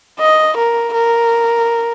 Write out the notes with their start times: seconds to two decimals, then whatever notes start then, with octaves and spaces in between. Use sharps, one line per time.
0.19 D#5
0.57 A#4
0.94 A#4